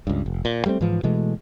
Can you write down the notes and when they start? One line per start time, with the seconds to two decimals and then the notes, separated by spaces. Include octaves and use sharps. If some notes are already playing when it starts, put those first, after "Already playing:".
0.07 C#2 G2
0.26 F1
0.45 A#2
0.66 G3 A3 A#3 C4
0.81 G#2 E3 F3
1.03 B2 E3 G#3 A3